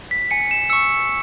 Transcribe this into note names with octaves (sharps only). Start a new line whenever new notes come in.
B6
G#5 C#7
E7
C#6 E6 C#7